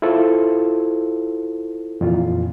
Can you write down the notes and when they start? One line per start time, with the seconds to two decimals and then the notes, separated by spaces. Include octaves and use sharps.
0.02 E4 F4 A4 C5
2.01 F2 A#2 E3 F4